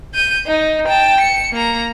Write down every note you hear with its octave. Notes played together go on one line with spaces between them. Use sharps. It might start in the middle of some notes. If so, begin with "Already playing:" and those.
G6 D#7
D#4
G5 A5
C#7
A#3 A#5